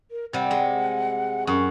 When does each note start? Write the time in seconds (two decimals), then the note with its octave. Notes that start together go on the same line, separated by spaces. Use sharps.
0.11 A#4
0.33 C3 G3 F#5
0.51 G#3
1.47 F#2 C#6